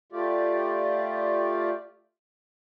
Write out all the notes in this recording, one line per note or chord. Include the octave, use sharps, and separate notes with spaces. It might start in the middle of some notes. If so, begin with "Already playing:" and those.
A3 F4 G4 D5